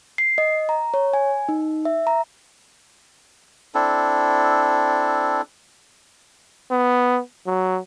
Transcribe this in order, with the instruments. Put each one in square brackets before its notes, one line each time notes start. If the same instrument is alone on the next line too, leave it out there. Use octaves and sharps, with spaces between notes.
[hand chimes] C7
D#5
A#5
C#5
G#5
D#4
E5
A#5
[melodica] C4 D4 E4 A4
[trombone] B3
F#3